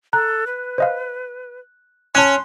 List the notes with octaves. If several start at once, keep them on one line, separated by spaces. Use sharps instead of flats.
A4 A#5 F#6
B4
C5 D#5 F5
C#4 A5 C6 F#6 G#6